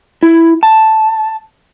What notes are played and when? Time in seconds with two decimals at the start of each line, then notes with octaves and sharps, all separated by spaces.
0.23 E4
0.63 A5